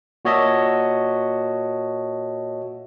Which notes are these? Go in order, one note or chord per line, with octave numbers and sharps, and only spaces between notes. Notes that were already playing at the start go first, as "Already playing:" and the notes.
A#2 F#4 C#5 D#5 E5 A5